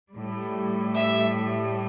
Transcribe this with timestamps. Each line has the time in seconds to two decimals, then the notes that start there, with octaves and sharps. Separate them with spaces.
0.15 A2 G3
0.97 E5